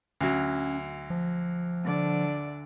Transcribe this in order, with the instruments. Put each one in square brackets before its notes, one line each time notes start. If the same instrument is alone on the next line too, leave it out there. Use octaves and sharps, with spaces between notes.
[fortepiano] D2 F#3 [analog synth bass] C#4
[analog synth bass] F3
[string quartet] D3 D5